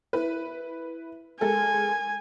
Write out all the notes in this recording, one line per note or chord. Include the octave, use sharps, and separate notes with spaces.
E4 B4
G#3 A4 A#4 G#5